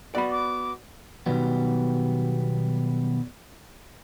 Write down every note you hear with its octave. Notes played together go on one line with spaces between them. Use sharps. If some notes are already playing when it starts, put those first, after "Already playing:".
B3 F#4 D5 B5
D6
B2 D#3 F#3 G3 B3